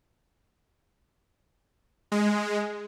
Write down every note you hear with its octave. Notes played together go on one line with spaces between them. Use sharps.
G#3